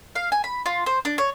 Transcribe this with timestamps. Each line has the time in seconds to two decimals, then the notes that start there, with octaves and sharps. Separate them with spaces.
0.15 F5
0.32 G#5
0.44 B5
0.66 F4
0.86 C5
1.05 D4
1.18 C#5